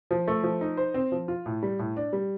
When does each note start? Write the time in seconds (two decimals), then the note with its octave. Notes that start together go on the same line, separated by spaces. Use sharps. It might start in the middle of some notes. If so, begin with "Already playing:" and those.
0.11 F3
0.28 A3
0.43 F3
0.61 D#4
0.77 C5
0.94 C4
1.12 F3
1.28 F4
1.46 A2
1.63 G3
1.79 A2
1.97 D4
2.13 G3